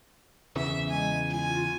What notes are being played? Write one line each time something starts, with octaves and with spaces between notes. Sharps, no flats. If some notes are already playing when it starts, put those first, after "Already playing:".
E2 C#3 E3 E5
G#3 G#5
F4 G#5